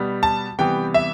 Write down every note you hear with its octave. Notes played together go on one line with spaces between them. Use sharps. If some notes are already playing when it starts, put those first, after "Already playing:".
Already playing: B2 G3 B3
A5
C3 E3 G3 B3 G5
E5